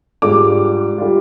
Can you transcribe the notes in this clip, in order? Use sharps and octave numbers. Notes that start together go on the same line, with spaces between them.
G#2 G3 D4 F4 D6
G3 D4 F4